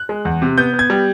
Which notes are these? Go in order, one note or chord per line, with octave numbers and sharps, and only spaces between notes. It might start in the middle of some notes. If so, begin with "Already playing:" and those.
Already playing: F#6
G#3
E2
C3
B3 G6
B3
G#6
G3